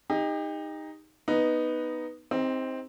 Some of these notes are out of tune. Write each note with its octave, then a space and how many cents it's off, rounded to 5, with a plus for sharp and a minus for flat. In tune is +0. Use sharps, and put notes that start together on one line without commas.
D#4 +0 G4 +35
B3 +0 D#4 +0 B4 +0
C4 +0 D#4 +20 G4 +40